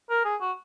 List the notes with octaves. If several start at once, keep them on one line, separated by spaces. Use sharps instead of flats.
A#4
G#4
F#4